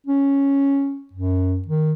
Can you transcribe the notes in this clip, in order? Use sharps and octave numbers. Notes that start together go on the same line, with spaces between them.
C#4
F#2
D#3